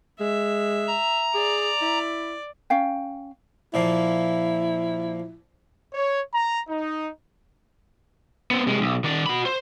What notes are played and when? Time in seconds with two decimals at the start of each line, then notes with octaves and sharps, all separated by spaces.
0.20 G#3 E5
0.87 A#5
1.34 G#4 D5
1.82 E4
2.70 C#4 F5 G5
3.74 A#2 F3 A#3 E4
5.94 C#5
6.34 A#5
6.68 D#4
8.51 B3 C4
8.67 C3 G#3
8.81 B1
9.04 D#3 D5
9.26 F#4 B5
9.46 C5